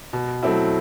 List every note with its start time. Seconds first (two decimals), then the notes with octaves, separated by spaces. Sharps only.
0.13 B2
0.43 F#3 A3 C4 E4